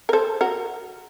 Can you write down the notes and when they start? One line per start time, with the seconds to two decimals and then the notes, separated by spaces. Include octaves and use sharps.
0.09 A#4
0.13 A4 C5
0.41 F#4 A#4